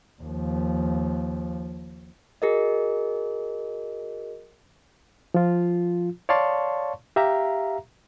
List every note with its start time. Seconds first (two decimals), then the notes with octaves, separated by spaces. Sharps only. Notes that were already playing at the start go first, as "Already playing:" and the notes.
0.22 D#2 F3
2.42 F#4 G#4 A#4 D#5
5.34 F3 F4
6.29 C#5 D5 F5 A5 C6 C#6
7.16 G4 E5 F5 A#5